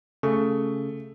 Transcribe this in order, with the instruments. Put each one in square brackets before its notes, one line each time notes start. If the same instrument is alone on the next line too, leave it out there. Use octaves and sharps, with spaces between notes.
[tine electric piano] C#3 [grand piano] A3